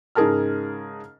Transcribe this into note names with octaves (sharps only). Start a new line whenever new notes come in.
G#2 C#3 G#4 A#4 A5 F6